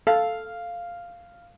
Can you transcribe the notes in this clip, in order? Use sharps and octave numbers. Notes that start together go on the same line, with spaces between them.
A4 F5